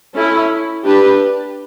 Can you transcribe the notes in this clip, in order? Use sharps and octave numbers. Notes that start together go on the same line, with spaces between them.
C#4 E4 A4
D4 G4 B4